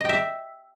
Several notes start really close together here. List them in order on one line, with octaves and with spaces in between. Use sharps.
D#5 G5 E5